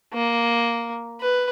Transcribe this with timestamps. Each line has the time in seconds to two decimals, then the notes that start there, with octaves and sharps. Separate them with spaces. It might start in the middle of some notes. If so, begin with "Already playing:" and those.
0.14 A#3
1.21 B4